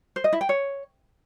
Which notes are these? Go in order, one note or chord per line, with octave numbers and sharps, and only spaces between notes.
C5
D#5
E4
G5
C#5